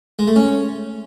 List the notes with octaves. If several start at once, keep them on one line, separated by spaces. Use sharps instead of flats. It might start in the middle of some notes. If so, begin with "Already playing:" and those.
G#3
A3
C#4